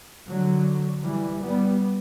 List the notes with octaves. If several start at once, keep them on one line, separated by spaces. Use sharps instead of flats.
D3 F#3
E3 G3
G3 B3